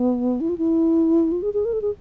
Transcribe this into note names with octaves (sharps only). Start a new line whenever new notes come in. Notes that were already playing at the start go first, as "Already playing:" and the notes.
Already playing: B3
E4
F4
E4
F4
G#4
G#4
A#4
A4
G#4